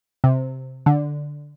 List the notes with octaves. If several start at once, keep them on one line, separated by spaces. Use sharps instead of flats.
C3
D3